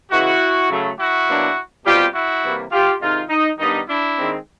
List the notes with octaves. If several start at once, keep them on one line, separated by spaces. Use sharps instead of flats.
C#3 E3 G#3 E4 F#4
C#3 F#3 A3
E4 F#4
B2 F#3 A#3 D4
B2 G3 C4 F4 G4
E4 F#4
C3 E3 G3 A#3
F4 G4
C3 D#3 G#3 D#4 F4
D#4
G2 D#3 G3 B3 D4 D#4
D4 E4
D#3 G#3 C4